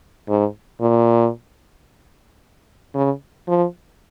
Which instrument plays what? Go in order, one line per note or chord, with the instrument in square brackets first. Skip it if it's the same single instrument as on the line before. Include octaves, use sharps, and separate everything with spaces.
[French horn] G#2
A#2
C#3
F3